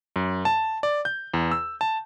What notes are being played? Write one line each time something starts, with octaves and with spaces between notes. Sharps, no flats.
F#2
A5
D5
G6
E2
E6
A5